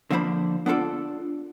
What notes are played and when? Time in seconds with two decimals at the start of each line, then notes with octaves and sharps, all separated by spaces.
0.11 D3 F3 A#3 C5 B5
0.66 B3 D4 F4 A4 D5